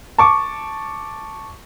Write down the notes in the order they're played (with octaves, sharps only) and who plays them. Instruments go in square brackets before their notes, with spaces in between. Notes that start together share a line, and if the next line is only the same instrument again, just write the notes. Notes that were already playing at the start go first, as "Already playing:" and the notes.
[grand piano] A5 C#6 D6